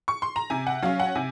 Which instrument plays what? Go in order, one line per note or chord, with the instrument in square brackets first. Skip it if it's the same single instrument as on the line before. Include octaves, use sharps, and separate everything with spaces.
[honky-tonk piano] C#6
C6
A#5
C3 G#5
F#5
F#3 C#4 F5
F#5
C3 G#5